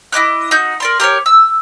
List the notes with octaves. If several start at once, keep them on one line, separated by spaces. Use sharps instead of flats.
E4 D#5 D6 F#6
D#4 F#4 G6
A#4 D5 C6
G4 A#4 B4 C#5
E6